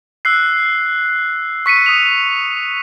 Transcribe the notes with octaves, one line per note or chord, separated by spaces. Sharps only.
E6 F#6 C7
C#6 B6 C#7 D#7
D#6 F7